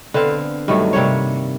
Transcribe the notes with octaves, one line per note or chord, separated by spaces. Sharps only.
D3 B3 C4 F5
G2 D#3 F#3 A3
C3 G3 A#3 C#5